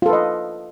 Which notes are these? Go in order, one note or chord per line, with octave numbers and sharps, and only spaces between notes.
F4 A4 B4 D#5